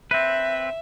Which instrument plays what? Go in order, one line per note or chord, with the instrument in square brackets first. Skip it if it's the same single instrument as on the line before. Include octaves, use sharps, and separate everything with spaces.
[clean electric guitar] C4 B4 [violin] E5